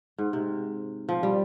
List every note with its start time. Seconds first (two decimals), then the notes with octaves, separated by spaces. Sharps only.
0.18 G#2
0.33 C3
1.09 F3
1.23 G3